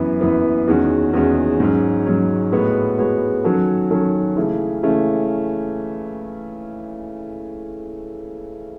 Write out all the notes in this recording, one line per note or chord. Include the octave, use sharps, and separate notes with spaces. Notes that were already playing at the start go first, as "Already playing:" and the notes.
Already playing: F#2 E3 B3
F#2 E3 B3
E2 D#3 G#3 C#4 F#4
E2 D#3 G#3 C#4 F#4
G#2 F#3 C#4
G#2 F#3 C#4
A2 G#3 B3 F#4 C#5
A2 G#3 B3 F#4 C#5
D#3 F#3 C#4 F#4 A4
D#3 F#3 C#4 F#4 A4
C#3 E3 A3 C#4
C#3 E3 A3 C#4